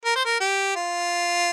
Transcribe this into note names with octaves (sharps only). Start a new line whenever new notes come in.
A#4
C5
A#4
G4
F4